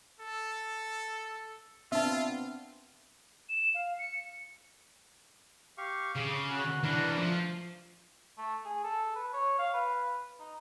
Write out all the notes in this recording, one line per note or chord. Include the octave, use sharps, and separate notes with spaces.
A4
B3 C4 D4 F4 E5 A5
E7
F5
C#7
G4 F5 C#6
C#3 F5 D6
F#4
E3 D4 A#4 B4 A#5
F3 A3
A3
G#4
A4
B4
C#5
F5
B4
D#4